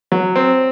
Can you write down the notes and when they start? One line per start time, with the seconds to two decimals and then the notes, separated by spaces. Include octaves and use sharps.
0.12 F#3
0.36 C4